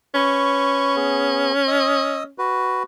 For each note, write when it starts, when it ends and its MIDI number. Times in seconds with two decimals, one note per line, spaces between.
0.14 2.32 61
0.14 0.96 71
0.14 0.96 85
0.96 1.53 59
0.96 1.53 68
1.68 2.23 75
1.68 2.23 87
1.68 2.23 88
2.38 2.83 66
2.38 2.83 71